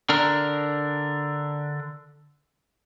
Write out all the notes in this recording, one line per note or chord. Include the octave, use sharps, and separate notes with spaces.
D3 D4 A#4